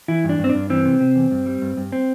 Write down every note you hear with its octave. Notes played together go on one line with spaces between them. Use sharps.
E3 E4
G2
D4
G2
C4
D4
G2
E3 C4
C3
C3
E2
G2
G3
G2
G2
C4